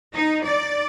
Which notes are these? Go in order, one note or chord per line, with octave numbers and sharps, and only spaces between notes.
D#4
D5